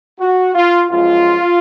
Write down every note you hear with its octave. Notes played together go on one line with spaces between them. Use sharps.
F#4
F4
F#2 F3 G#3 F4